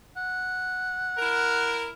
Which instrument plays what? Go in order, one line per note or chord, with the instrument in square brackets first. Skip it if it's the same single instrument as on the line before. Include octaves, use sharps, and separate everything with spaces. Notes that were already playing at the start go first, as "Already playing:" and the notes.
[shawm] F#5
[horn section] E4 A#4